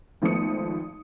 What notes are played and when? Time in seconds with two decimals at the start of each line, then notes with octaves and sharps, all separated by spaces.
0.22 G#1 F3 A3 B3 D#6 C#7